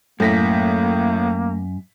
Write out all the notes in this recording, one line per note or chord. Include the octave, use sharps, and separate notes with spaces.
F#2 A2 A3 A#3 A#6 B6